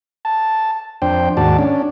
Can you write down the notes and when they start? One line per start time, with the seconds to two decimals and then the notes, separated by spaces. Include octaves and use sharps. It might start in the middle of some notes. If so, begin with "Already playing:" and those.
0.25 A5
1.02 F2 D4 C5 G5
1.37 D#2 G#2 F#4 D5 A5
1.59 C#4 D4